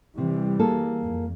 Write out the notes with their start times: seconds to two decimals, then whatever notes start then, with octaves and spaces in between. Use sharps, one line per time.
0.18 C3 E3 G3
0.59 A#3 G#4 A4
1.01 F2